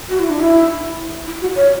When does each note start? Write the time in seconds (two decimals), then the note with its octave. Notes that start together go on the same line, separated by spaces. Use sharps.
0.09 F#4
0.19 E4
0.30 D4
0.40 E4
1.26 E4
1.41 F#4
1.56 C#5